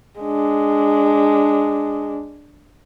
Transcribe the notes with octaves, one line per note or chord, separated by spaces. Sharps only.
G#3 D4